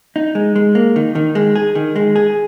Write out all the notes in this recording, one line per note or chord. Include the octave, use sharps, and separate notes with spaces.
D#4
G#3
G#3
A#3
D#3
D#3
G#3
G#4
D#3
G#3
G#4